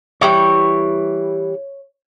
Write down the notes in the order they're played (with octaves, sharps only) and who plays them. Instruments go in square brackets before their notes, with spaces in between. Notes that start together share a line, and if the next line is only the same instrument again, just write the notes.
[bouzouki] E3 G3 G5 [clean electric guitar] C#5